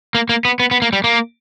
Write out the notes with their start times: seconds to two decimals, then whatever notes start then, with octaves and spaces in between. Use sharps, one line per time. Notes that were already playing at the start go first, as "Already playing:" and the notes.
0.15 A#3
0.29 A#3
0.45 B3
0.60 B3
0.71 B3
0.82 A#3
0.93 G3
1.04 A#3